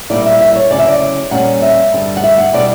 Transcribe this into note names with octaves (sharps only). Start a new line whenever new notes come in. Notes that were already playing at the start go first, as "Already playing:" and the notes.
A#2 G3 A#3 E4 D5
E5
E5
C#5
D2 C#3 F#3 C#4 E4 D5
E5
D5
A#2 G3 A#3 C#4 F#5
E5
G2 D3 G3
F#5
E5
F#5
B2 G3 B3 E4 D5